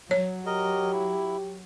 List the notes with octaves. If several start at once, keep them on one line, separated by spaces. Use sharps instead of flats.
F#3 C#5
G4 A#4 D#5
E4